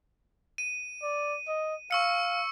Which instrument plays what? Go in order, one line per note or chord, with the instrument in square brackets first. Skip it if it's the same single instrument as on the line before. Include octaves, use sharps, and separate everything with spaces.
[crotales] D#7
[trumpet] D5
D#5
[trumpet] F5 [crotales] C#6 E6 C#7